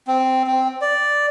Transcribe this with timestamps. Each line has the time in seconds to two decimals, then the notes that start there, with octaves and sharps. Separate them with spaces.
0.07 C4
0.47 C4
0.81 D5